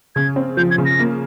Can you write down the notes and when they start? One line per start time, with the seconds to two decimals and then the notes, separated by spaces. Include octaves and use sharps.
0.15 C#3 G#6
0.36 C4
0.57 F3 G6
0.71 G#6
0.78 C#3
0.85 A#6
0.99 A#3